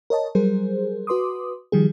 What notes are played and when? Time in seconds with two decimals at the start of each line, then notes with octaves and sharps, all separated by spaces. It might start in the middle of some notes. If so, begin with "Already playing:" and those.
0.10 A#4 C#5 D#5 A5
0.35 F#3 G3 G#4 A#4 C5
1.07 F#4 B4 C6 D6 D#6
1.72 D#3 F3 G3 G4 G#4